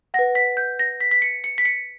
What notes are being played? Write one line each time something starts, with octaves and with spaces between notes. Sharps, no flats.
B4 F#5 A#6
B6
G6
A#6
B6
B6
C#7
C#7
B6
C#7